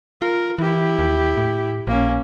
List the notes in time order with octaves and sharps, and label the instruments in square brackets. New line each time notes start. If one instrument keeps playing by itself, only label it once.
[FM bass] F4 [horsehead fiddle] A#4
[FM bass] E3 [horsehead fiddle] E4 G4
[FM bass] D#2
A2
[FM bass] A#1 [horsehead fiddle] A#3 C#4